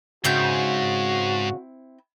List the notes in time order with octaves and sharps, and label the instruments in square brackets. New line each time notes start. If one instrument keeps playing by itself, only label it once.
[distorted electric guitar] G#2 [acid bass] C#3 [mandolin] C4 E4 G6 [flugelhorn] F#4